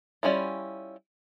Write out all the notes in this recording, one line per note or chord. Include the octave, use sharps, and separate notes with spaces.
G3 C#4 E4 F4